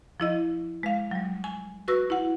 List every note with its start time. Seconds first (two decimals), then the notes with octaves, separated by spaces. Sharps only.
0.20 F3 E4 D#5
0.83 G#3 F5
1.11 F#3 G3
1.44 G#5
1.88 F#4 B4 C#6 E6 A#6
2.10 E4 F#5